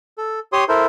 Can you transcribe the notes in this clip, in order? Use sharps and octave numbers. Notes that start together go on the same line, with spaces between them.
A4
G4 C#5 C6 D#6
E4 A4 A#4 C5